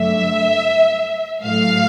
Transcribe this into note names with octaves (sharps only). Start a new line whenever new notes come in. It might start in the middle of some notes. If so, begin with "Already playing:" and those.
Already playing: G2 D3 F#3 A3 E5
A2 F#3 A3 F5